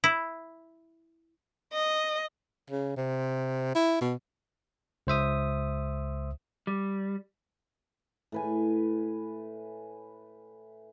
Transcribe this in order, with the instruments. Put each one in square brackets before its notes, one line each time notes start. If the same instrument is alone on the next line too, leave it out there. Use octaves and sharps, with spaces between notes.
[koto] E4
[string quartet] D#5
[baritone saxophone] C#3
C3
E4
B2
[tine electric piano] C#2 C5 E5 D#6
[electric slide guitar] G3
[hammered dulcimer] A2 B4 G#5